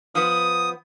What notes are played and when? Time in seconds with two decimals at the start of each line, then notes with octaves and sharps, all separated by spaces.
0.15 F3 B3 D#6